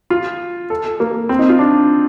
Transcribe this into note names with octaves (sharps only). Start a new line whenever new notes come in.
F4
A4
A4
A#3
C4
D#4
F4
D4